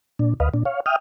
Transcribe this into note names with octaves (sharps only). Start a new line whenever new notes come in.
A#2 D4
D2 B4 D#5 F5
A#2 D4
C#5 F5
E5 G5 D#6 F6